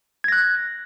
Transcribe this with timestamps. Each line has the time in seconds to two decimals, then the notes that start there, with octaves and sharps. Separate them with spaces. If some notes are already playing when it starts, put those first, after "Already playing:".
0.24 G#6
0.28 A#6
0.32 F#6